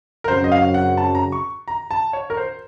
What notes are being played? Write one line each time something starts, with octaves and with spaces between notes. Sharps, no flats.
A#4
F#2 C#3 F#3 C4 F#4 C5
D#5
F5
F#5
A5
A#5
C#6
A#5
A5
C#5
A#4
C5